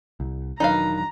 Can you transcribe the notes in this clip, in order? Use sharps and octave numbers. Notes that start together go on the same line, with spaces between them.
C2
E1 D#3 F#3 D4 D#4 B4 F5 A#5